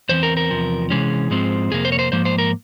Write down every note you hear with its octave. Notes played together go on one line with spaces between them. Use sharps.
E2 E3 C4 C5
A#4
A#4
E2 C3 F3
C3 E3 G#3 C#4 G#4
G#2 F3 G#3 C4
F2 C3 A#3 G#4
C5
C#5
C5
G#2 F3 A#3 C5
C5
A#4